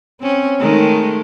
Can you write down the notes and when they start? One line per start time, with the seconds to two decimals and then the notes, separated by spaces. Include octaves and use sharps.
0.21 C4 C#4
0.60 D#3 G#3 A3